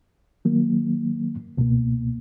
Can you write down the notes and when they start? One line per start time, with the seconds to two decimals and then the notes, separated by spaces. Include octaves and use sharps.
0.45 D#3 F#3 A#3
1.58 C#2 B2 A#3